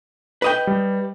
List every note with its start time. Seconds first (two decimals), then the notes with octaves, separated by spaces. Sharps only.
0.42 B4 D#5 G5
0.67 G3